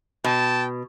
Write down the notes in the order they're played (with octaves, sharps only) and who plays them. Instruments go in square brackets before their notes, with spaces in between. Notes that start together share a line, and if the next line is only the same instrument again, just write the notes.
[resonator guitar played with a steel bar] B2 [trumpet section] G5 A5